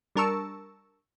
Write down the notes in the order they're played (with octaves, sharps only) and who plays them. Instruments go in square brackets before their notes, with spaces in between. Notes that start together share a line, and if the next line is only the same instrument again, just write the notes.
[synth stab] G3 D4 A#4 A5 C#6 E6